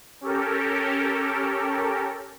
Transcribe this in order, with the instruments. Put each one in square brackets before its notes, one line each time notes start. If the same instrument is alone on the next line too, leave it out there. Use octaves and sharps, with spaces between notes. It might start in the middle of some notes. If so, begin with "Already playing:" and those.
[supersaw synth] C#4 G4 A4 A#4